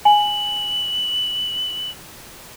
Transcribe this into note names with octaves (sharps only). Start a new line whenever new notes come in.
G#5 F#7